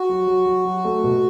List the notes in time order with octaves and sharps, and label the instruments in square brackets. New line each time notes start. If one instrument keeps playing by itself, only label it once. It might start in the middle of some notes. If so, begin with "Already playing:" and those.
Already playing: [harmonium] F#4
[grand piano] F#3
F#3
F#3
F#3
A3
B2